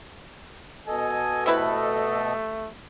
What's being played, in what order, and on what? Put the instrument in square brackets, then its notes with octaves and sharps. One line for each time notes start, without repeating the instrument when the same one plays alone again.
[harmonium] B2 A4 D#5 [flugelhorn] G#5
[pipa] C3 E4 B4 [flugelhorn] A3